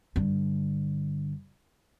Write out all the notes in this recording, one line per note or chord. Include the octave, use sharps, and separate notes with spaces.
G2 D3